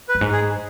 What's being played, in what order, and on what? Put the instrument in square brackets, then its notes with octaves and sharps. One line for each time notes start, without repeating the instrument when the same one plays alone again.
[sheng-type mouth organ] B4
[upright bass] F#2
G#2
[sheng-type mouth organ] G#4